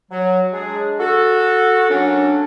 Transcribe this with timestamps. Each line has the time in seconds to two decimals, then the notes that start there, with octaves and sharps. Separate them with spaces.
0.11 F#3
0.53 G#3 D4 G#4
1.00 F#4 A4
1.90 F#3 A#3 C#4 D4